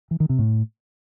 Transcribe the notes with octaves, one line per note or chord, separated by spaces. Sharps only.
E3
D#3
C3
A2